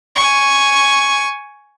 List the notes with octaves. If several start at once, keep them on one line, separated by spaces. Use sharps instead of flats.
G#5 C#6